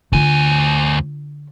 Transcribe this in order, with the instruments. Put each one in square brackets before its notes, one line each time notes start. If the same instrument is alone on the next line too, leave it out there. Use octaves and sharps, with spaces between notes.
[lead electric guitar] D2 G#5 [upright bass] D3 F4